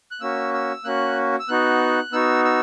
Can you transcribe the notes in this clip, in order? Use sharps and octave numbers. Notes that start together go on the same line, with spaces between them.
F#6
A#3 C#4 F#4 E6
E6
A#3 C#4 F#4 F#6
E6
B3 D#4 F#4 F#6
B3 D#4 F#4 E6
E6